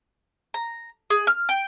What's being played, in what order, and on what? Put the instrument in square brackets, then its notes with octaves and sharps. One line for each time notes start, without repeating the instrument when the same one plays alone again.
[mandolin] A#5
G#4
F6
G5